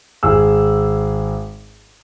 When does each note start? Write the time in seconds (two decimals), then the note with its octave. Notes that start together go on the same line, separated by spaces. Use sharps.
0.23 G#1 G#4 E6